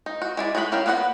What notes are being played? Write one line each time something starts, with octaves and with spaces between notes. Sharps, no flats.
D#4
F#4
G#3 E4 D5
G#3 D#4 F#4 C5 B5
C#4 E4 A#4 F5 G5
A#3 B3 B4 D#5 F#5